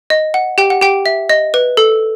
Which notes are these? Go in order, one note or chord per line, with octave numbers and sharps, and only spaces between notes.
D#5
F#5
G4 G5
F#5
G4 G5
E5
D#5
B4
A4